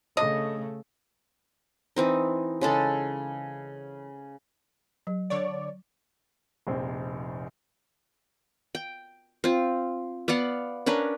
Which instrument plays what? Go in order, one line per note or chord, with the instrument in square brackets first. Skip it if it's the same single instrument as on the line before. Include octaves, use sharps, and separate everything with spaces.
[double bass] C#3 A3 [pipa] D4 D#5
[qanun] E3 C4 D#4
C#3 G#3 A4
[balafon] F#3
[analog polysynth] D3 C#5 D5
[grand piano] F1 A#1 C4
[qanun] G5
C4 F4
B3 D5 F5 F#5
C#4 D4 A#4 B4